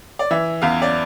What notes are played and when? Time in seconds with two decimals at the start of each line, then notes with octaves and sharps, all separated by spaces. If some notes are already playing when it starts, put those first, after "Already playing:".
0.19 D5
0.31 E3 E5
0.62 E2 F5
0.82 D5